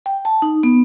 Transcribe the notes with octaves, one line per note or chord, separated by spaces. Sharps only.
G5
A5
D#4
B3